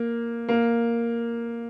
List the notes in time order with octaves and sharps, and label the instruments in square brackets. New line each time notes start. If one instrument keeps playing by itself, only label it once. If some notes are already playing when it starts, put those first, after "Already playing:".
Already playing: [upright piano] A#3
A#3